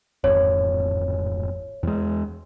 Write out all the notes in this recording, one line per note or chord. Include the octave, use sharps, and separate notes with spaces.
D1 G#1 F2 C#5
E2 G#3